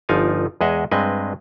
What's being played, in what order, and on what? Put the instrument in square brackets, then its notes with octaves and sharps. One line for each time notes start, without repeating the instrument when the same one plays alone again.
[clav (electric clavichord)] G1 F3 D#4 D5 F5 G#5
E2 G#3 G#4 D#5 E5 F#5
G2 G#3 C4 B4 D#5 G#5